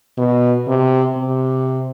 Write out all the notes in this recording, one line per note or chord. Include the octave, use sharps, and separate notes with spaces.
B2
C3
C3